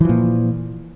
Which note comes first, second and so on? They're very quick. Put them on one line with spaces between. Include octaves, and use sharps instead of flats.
E3 F3 A#2